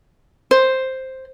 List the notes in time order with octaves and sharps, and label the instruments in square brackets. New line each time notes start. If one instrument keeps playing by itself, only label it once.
[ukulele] C5